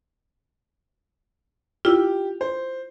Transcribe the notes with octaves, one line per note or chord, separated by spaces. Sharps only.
E4 F4 G4
C5